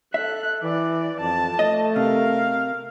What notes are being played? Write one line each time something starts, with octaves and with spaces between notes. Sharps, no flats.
A4 E5 F#6
E3 D5
F2 A5
A3 D#5
C3 A#4 F5